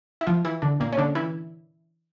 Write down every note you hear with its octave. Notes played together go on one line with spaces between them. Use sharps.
E4
F3 F4
E3 E4
D3 D4
A#2 A#3
C#4
D3 D4
E3 E4